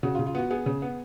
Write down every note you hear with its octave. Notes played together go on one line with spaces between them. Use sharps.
C#3 F#4
F4
C#3
F4
B3 F#4
B3 G#4
C#3
B3